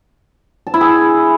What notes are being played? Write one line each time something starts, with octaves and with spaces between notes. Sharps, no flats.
A5
E4
G#4